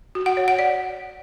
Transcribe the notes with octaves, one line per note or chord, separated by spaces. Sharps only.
F#4
F#5
C#5
F#5
D5